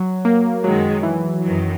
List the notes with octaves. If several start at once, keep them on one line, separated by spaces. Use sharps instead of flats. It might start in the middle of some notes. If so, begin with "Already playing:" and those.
Already playing: F#3
A#3
F#2 D#3 F#3 G#3
E3
F#2 D#3 F#3